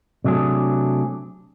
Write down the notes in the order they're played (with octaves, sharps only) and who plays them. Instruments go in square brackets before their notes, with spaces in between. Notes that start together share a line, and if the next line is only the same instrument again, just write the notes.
[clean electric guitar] C3 F#3 A3 D4 G#4